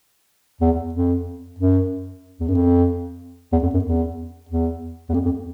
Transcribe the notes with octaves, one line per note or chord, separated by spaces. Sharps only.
E2
F2
F#2
E2
F#2
F2
E2
F2
F#2
E2
E2
E2
F2
F2